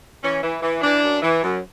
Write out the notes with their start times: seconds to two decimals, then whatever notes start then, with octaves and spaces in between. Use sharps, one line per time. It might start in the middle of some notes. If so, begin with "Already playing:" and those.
0.23 E3 C#4
0.43 E3
0.62 E3
0.82 E3 D4
1.02 F#2
1.22 E3
1.43 F#2